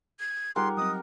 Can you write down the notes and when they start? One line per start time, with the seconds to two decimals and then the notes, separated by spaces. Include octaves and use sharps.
0.20 G#6
0.56 G3 D#4 F4 G4 G#4 A#4 F#5 C6
0.77 F#3 C4 D#5 D#6